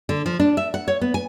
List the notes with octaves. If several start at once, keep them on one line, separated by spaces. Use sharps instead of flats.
D3
F3
D4
E5
F#5
C#5
B3
G#5